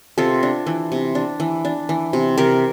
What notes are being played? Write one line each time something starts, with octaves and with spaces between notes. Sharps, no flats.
C3 F4 A4
D4
E3
C3
D4
E3
D4
E3
C3
C3 G4 A#4